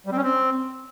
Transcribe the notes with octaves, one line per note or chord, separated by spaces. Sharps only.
G3
C4
C#4
C4